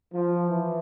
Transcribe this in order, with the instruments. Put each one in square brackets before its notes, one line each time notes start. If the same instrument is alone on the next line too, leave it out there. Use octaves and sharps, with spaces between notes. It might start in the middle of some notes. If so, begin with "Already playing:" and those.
[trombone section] F3
E3